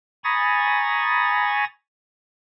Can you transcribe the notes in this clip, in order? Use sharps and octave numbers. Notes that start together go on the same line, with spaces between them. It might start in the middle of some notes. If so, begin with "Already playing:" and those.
G#5 A#5 B5 C#6 D#6 A6